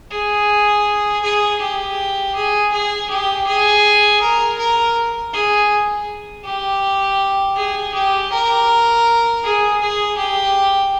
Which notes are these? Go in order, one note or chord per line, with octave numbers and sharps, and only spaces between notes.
G#4
G#4
G4
G#4
G#4
G4
G#4
A#4
A#4
G#4
G4
G#4
G4
A#4
G#4
G#4
G4